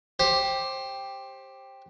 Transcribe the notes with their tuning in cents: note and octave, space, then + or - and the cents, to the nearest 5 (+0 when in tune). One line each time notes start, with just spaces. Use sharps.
G4 +5 C5 +25